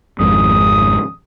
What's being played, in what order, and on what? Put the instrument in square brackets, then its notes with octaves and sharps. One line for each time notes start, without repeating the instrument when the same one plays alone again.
[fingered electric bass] G#1 F2 G#2 [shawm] D#6